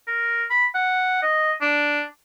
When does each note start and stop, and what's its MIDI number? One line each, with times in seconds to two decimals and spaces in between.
0.07 0.45 70
0.50 0.66 83
0.75 1.18 78
1.22 1.53 75
1.61 2.03 62